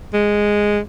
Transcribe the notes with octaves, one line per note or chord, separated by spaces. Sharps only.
G#3